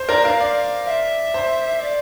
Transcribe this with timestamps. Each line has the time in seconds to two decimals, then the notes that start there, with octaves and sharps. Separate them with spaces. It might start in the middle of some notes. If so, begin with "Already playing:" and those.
Already playing: C5
0.09 A#4 D5
0.24 A#4 F5
0.40 D5 F5
0.87 E5
1.34 C5
1.81 D5